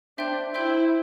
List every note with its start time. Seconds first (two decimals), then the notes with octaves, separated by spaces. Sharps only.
0.18 D4 C5 E5 G5 C6 G6
0.54 E4 C5 E5 G5 C6 G6